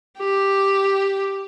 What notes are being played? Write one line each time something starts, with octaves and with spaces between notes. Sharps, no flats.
G4